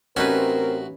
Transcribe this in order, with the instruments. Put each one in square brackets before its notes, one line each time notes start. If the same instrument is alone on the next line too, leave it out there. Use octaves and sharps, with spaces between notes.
[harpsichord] A1 F#4 E5 [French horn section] C4 A#4 [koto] C#4 D#4 B4